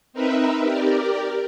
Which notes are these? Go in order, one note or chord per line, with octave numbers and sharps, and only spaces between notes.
C4 D#4 A#4 B4 E5
G4 A#4 D5